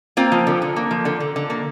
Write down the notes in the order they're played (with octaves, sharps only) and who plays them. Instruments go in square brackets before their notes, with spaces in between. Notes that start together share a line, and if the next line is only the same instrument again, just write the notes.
[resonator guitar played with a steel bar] A#3 C4 F4
F3
D3
D3
A#3
F3
D3
D3
D3
A#3